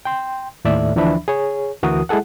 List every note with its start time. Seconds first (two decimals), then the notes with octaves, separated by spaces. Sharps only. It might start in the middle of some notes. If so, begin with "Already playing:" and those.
0.05 G5 C6
0.65 D#2 A2 A4 D5 E5
0.96 D2 E3 F3 D4 E5 B5
1.28 G#4 C#5
1.82 D2 E3 F#4 A#4 D#6
2.09 G#3 E4 G#4 A4 F#5